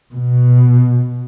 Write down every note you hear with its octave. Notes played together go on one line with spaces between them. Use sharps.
B2